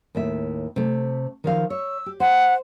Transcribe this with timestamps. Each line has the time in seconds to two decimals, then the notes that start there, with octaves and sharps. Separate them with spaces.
0.15 D#2 A2 E5
0.76 C3 A3
1.44 D#3 F3 F5
1.70 C#5 E6
2.06 G4
2.20 C5 F#5